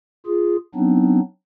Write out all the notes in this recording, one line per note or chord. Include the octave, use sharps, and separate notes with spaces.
F4 G#4
F#3 B3 C4 D4 D#4